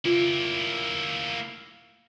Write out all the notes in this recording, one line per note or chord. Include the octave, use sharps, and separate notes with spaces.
A#3 E4 F4